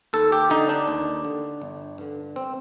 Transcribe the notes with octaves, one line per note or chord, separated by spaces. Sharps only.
D#2 A4
G4
D3 D#4
D4
D#2
D3
G1
G2 D3
C4